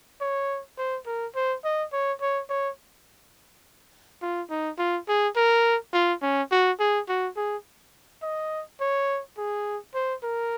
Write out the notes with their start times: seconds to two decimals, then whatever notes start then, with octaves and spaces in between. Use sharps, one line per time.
0.21 C#5
0.78 C5
1.07 A#4
1.35 C5
1.64 D#5
1.93 C#5
2.21 C#5
2.50 C#5
4.22 F4
4.50 D#4
4.79 F4
5.08 G#4
5.37 A#4
5.93 F4
6.22 C#4
6.52 F#4
6.80 G#4
7.09 F#4
7.37 G#4
8.23 D#5
8.81 C#5
9.38 G#4
9.95 C5
10.23 A#4